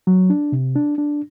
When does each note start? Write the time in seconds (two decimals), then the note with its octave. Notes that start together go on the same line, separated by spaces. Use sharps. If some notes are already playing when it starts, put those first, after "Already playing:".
0.07 F#3
0.30 D4
0.52 C3
0.76 D4
0.98 D4